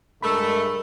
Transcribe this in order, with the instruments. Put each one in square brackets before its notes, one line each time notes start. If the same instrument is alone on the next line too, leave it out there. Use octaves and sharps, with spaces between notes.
[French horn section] G2 G#3 A#4 [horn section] A3 [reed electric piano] B5 E6